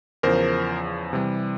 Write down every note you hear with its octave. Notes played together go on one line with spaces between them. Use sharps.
E2 C#3 F3 A#4 C5
C3 E3 G3